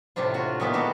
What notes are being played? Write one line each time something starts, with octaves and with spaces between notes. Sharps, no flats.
A2 C3 C4 D4 F4
F4 F#4
A#2 D#3 G#3 A#3 B3 E4
A3 D4 F#4 G4